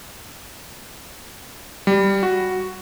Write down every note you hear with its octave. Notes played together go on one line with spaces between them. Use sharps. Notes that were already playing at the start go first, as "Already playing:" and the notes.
G3
F#4